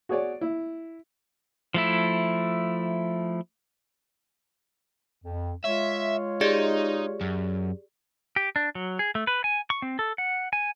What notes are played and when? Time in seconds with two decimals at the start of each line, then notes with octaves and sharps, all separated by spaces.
0.09 F#4 G#4 C#5 D5
0.41 E4
1.74 F3 A3 E4
5.24 F2
5.65 G#3 F4 C#5 E5
6.41 D#4 G4 G#4 D5
7.21 F#2
8.36 G4
8.56 D4
8.75 F#3
8.99 G#4
9.15 A3
9.27 B4
9.44 G#5
9.70 C#6
9.82 C4
9.99 A4
10.18 F#5
10.53 G#5